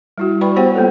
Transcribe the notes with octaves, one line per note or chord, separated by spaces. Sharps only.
G3 E4 F#4
B4 D5 G5 B5 C#6
B3 G4 C5 C#5 F#5 G5
G3 A#3 B3 F4 A4